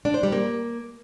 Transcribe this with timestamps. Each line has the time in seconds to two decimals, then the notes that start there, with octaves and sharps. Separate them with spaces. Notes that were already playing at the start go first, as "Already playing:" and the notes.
0.05 D4
0.14 C5
0.23 G3
0.32 A#3